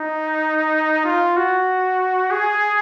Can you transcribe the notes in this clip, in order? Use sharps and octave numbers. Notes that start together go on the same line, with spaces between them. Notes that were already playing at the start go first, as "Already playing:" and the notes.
Already playing: D#4
F4
F#4
G#4